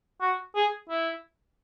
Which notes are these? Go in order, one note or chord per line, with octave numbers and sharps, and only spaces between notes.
F#4
G#4
E4